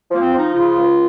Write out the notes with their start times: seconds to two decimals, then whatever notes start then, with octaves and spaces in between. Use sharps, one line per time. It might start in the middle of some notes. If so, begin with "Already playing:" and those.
0.09 F3
0.15 A#3
0.21 C4
0.32 F3
0.37 D#4
0.54 C#3 F4
0.76 C#2